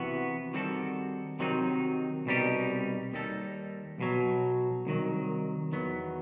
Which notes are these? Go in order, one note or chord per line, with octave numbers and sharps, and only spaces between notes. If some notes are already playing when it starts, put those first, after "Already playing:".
Already playing: C3 E3 B3 F#4
D#3 G3 C4 F#4 A4
C3 D#3 F#3 C4 D#4
C2 B2 G3 D#4 G4
D#2 D#3 G3 D#4 A4
B1 B2 F#3
C2 C3 D#3 F#3
E2 D#3 F#3 B3